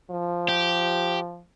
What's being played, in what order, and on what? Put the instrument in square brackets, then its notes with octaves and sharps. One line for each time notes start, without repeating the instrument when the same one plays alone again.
[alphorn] F3
[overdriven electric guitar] G4